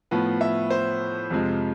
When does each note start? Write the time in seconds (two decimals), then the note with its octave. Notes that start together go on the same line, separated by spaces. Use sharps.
0.11 A2 F3 B3
0.41 E5
0.70 C5
1.30 F2 C3 F3 G#3